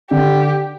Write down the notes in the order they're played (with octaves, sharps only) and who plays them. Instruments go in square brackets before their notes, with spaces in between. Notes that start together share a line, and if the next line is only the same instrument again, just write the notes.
[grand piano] D3 [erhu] G4